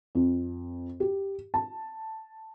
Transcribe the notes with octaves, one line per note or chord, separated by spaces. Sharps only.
F2
G4
A5